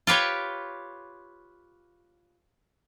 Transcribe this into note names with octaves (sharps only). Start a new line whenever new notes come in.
F4 G4 B4 C#5